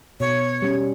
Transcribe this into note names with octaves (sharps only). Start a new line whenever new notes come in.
B2 C#5
G3 C#4